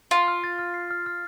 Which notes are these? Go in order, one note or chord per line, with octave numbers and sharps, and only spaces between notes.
F4 F6
F6
A6
F6
C7
F6
F6